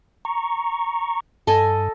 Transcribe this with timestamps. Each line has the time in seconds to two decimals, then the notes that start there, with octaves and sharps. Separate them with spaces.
0.25 A#5 C#6
1.47 G2 A4 D#5 G#5